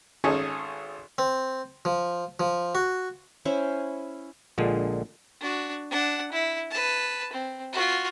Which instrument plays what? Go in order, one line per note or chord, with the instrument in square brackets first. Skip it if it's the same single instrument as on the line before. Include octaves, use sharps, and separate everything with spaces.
[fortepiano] G#1 C#4 D#4 G#4 A4
[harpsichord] C4
F3
F3
F#4
[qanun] C#4 E4 C5
[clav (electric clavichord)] A#1 A#2 D3 G#3
[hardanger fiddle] D4 F#4
D4 F#5
E4
B4 A5
C4
F4 F#4